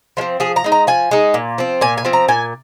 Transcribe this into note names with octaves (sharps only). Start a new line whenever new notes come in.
F3 G#3 C4
F3 G#4
A#5
G#3 D#4
A#5
F3 G#5
G#3 D#4
A#2
F3 C4
A#2 G#5
G#5
F3 C4
A#5
A#2 G#5